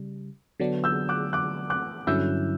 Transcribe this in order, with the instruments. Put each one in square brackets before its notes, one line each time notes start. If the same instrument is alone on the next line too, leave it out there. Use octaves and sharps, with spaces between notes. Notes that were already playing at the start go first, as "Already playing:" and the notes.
Already playing: [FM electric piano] C#3 G3
D3 F#3 B3 D4
[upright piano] E6 G6
D6 F#6
D6 F#6
D6 F#6
[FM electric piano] G2 D3 F#3 C#4 E4 [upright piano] E6 G6